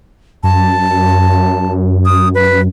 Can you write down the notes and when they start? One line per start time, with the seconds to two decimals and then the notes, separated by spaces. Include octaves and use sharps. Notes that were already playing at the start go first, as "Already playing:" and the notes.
0.43 F#2 A5
2.05 D#6
2.35 B4